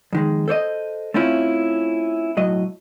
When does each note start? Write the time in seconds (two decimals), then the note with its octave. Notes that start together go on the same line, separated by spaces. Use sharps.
0.13 F2 D#3 G#3
0.48 A4 C5 C#5 D#5
1.14 A3 C4 C#4 E4 F4
2.37 B1 A2 F#3 D#5